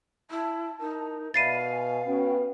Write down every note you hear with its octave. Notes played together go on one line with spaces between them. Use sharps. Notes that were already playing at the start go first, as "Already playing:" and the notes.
E4 A5
D#4 A#4
B2 D5 E5 F5 B5 A6 C7 D#7
G#5
B3 C#4 F#4 G5